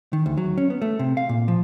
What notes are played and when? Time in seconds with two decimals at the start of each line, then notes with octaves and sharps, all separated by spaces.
0.13 D#3
0.26 D2
0.37 F#3
0.58 C#4
0.70 B3
0.82 A3
0.99 C3
1.17 F5
1.29 A#2
1.48 F3